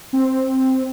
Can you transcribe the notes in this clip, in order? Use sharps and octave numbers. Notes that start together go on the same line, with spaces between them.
C4